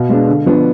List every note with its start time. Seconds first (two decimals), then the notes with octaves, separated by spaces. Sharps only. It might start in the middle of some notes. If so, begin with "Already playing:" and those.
Already playing: B2 F5
0.09 G#3 B3 D4
0.28 D3
0.46 F3 B3 D4